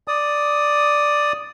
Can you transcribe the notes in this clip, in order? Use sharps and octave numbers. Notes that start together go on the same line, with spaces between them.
D5 D#6